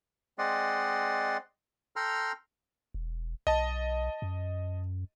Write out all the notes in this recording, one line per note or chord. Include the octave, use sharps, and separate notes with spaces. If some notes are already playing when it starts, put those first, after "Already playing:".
G#3 C4 D5 D#5 F#5 C6
A4 G5 A#5 C6 F6
E1
B1 D#5 A5
F#2